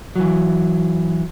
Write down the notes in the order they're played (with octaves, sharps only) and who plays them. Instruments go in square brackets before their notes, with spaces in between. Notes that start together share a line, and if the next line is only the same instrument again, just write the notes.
[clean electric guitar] E3 F#3